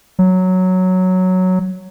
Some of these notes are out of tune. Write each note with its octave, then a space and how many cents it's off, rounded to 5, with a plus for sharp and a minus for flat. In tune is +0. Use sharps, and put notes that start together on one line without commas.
F#3 +0